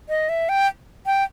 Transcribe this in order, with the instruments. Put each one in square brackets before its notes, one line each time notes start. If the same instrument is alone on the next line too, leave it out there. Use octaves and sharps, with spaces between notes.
[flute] D#5
E5
G5
G5